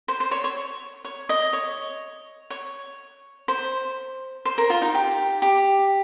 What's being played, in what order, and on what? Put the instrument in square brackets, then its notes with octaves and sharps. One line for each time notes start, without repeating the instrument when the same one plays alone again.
[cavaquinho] C5
C5
C#5
C#5
C#5
D#5
C#5
C#5
C5
C5
A#4
F4
D#4
G4
G4